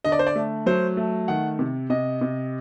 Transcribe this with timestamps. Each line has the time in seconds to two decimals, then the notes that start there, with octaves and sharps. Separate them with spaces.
0.04 D3 D#5
0.12 D5
0.19 C5
0.27 D5
0.36 A3
0.66 F#3 C5
0.97 A3
1.28 D#3 F#5
1.59 C3
1.90 C3 D#5
2.21 C3